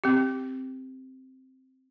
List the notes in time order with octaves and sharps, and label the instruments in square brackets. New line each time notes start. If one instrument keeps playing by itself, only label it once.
[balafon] C4 G4